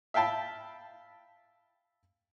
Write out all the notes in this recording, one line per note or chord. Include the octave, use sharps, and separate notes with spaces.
E5 F5 G5 A5 B5